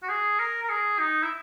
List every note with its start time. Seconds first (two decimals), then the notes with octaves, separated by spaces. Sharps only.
0.03 F#4
0.09 G#4
0.39 A#4
0.62 A#4
0.69 G#4
0.99 D#4
1.23 E4